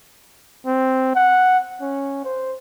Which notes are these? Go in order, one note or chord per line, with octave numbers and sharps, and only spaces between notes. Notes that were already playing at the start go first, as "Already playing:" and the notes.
C4
F#5
C#4
C5